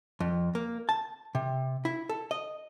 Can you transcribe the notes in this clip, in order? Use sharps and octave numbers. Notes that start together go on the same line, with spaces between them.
F2
A#3
A5
C3
E4
A4
D#5